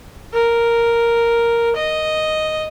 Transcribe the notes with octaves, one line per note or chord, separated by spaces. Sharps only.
A#4
D#5